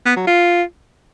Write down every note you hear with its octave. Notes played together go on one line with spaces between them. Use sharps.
B3
F#3
F4